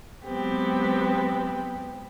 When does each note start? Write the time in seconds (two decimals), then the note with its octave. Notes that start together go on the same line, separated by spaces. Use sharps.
0.24 F#3 G#3 B3 C4 G4